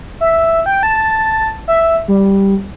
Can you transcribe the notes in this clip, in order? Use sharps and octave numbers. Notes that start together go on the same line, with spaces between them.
E5
G5
A5
E5
G3